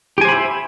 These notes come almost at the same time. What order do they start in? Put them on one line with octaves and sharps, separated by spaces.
G4 G#5 C5 B5 E5